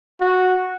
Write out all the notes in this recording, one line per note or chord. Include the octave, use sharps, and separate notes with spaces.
F#4